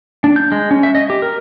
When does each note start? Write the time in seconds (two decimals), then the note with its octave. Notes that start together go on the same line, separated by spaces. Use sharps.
0.24 D4
0.36 G6
0.52 G#3
0.71 C#4
0.83 E5
0.95 D#5
1.10 G4
1.22 A#4